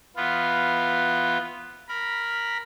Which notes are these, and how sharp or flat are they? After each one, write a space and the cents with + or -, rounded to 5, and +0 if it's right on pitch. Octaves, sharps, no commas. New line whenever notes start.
E3 +0 B3 +0 F4 +0
A#4 +0 B5 -10